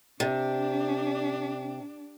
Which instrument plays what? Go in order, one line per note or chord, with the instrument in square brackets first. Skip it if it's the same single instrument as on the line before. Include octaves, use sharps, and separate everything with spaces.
[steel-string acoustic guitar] C3 [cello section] D4